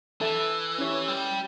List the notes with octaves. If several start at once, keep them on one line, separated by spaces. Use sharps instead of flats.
E3 A4 E5 A5
C#4 E4 G4 C#5
G3